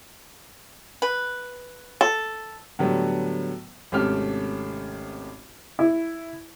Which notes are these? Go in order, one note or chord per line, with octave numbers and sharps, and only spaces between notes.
B4
A4
A2 D3 F#3 G3 A3 B3
G#1 C3 A3 C#4 G4 F6
E4